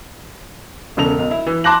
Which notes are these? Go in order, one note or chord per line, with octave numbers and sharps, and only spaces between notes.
E1 C#3 A4 F7
B1
E4
E3
A5 C6 D6 F#6 A#6 F#7